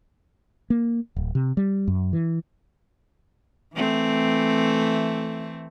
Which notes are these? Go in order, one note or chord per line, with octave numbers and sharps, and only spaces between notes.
A#3
D1
C3
G3
F#2
E3
E3 A3 C4